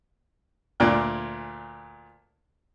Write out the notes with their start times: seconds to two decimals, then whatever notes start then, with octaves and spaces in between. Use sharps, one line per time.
0.80 D2 A#2 D5